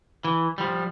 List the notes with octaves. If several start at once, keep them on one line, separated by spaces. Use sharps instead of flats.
E3
F3 G3